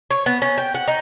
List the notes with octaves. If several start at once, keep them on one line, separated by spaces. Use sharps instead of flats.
C#5
B3
C#4
G5
F#5
D#4